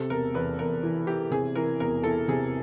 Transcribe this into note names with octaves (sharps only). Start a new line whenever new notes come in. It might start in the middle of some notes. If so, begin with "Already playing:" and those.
Already playing: C3 A4
E1 A#4
E2 B4
E2 A#4
E3
E3 G4
C3 G#4
E3 A#4
E1 A#4
E3 A4
C3 G#4